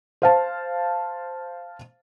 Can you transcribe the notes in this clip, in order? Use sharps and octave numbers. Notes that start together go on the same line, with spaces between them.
C5 F5 A5